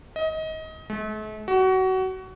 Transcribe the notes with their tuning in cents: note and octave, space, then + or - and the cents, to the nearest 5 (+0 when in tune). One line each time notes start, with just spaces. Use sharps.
D#5 +25
A3 -45
F#4 +25